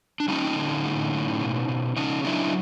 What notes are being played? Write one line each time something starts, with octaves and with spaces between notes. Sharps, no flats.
D4
G3 C#4 D#4
D3
A2
A2
B2
B2
C#3 C#4 D#4
F#3 D4 E4